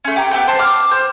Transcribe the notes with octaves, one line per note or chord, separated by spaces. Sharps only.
A3 C#4
G4 A#5
B3 C4 G4 G6
C5 A5
D6 F6
C5